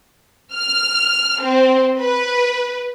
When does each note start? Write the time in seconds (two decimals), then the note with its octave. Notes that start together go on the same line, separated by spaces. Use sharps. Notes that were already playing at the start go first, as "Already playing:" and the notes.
0.54 F6
1.42 C4
2.00 B4